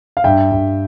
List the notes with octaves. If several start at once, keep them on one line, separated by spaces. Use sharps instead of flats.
F5
G2 E5 G5
G2